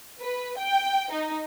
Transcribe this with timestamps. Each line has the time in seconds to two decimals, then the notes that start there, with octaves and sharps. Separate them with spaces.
0.21 B4
0.58 G5
1.12 D#4